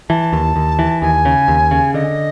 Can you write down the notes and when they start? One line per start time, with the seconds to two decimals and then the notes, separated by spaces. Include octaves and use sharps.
0.10 E3 A5
0.33 D#2
0.56 D#2
0.79 E3
1.02 D#2 G#5
1.25 C#3
1.48 D#2
1.71 C#3
1.94 D3 D#5